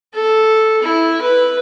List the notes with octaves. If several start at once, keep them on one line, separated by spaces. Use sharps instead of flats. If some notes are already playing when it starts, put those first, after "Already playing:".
A4
E4
B4